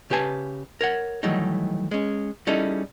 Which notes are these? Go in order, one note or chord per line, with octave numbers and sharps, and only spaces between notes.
C#3 G4 B4 G#5 A5
A#4 C#5 F#5
D#3 E3 F#3 G3 A3 D#4
G#3 C#4
G3 C#4 D#4 E4 G#4 A4